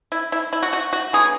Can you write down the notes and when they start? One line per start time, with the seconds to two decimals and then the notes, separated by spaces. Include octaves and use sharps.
0.12 E4
0.32 E4
0.53 E4
0.63 F#4
0.73 F#4
0.93 F#4
1.13 D3 F#3 B3 G#4